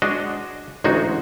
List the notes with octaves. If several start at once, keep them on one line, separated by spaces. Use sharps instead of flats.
G#3 D4 F#4 D#5
A1 D2 G#3 D#4 F#4